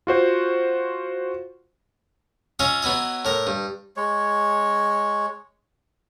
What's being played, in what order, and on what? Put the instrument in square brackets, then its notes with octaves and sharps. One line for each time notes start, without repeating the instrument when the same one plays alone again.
[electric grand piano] F4 F#4 C5
[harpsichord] C#4 F4 D#5 E5
F#3 B3 E4 D#5
A2 A#4
G2
[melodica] G#3 C#5